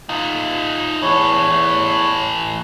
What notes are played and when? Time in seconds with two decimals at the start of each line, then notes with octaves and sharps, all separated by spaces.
0.09 D#4 F4
1.02 E2 E3 A3 C#5